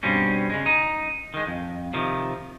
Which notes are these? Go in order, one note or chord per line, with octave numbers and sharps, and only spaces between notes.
G2 B2 G3 C4 C#4
C#3 G#3
D#4
D#3 G#3
F2
C3 D#3 F3